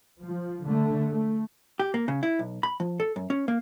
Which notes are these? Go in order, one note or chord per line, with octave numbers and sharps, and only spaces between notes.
F3
D3 A3
A3
G4
A#3
C#3
E4
B1
B5
F3
A4
F#2
C#4
A#3